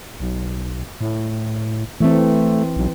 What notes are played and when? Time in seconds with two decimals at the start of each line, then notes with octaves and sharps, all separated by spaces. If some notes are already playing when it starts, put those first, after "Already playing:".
0.20 B1
1.01 A2
2.01 E3 A3 C4
2.77 B1